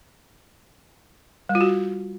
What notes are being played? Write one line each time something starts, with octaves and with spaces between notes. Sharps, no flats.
G3
F4
F#4